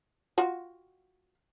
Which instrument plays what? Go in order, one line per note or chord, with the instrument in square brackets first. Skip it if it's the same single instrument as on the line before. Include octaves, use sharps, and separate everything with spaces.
[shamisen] F4 F#4